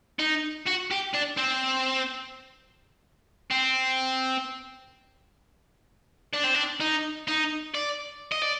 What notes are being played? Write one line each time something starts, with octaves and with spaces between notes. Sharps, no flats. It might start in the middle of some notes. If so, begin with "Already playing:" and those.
D#4
F#4
G4
D4
C4
C4
D4
C4
D4
D#4
D#4
D5
D#5
D5